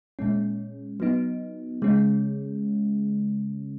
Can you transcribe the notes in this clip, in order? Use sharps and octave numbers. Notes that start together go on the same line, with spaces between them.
A#2 G#3 C#4
F#3 B3 D#4
C#3 G#3 C#4